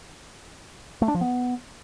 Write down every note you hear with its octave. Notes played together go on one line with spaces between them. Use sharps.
A3
D4
F3
B3